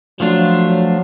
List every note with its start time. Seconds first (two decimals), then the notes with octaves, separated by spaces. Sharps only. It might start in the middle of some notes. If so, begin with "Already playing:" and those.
0.19 F3 F#3 A3 D4 F4
0.68 F#3